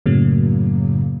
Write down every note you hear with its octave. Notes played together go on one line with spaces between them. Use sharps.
F#2 A2 C#3 F#3 A#3